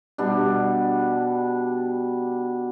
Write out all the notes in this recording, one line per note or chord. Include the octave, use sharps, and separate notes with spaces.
B2 G3 D4